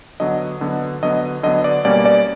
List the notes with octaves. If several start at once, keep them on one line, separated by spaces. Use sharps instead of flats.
D3 F#3 B3 D#5
D3 F#3 B3
D3 F#3 B3 D#5
D3 F#3 B3 D#5
D5
B2 G3 A#3 C#4 D5
D5